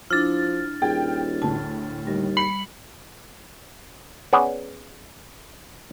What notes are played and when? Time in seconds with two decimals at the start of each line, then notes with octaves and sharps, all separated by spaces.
0.10 F3 D4 E4 F6 A6
0.82 D#1 G#4 G5
1.42 D2 A2 A5
2.07 D#2 G3
2.37 B5 B6 C#7 F#7
4.33 B3 C#4 G#4 D5 F#5